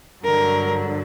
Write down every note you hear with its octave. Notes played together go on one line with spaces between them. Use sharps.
G2 D3 F#3 A#4